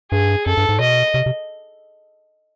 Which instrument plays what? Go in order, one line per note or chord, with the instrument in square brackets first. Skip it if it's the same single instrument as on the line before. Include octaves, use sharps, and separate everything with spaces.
[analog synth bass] G2 [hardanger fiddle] G#4
[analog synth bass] F#2 [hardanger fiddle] A4
[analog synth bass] G2
G#2
[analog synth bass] B2 [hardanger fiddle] D#5
[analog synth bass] C3
C3